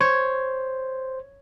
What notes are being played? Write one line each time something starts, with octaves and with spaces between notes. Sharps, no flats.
C5 C#5